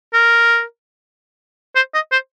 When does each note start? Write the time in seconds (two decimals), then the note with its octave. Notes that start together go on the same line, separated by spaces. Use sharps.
0.14 A#4
1.76 C5
1.94 D#5
2.12 C5